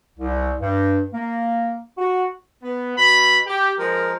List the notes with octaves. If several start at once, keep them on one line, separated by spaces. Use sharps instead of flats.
C2
G2
A#3
F#4
B3
B2 B5
G4
F3 G#3 A#4